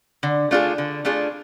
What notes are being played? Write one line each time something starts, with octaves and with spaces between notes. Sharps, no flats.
D3
A3 D4 F4 G#4
D3
A3 D4 F4 G#4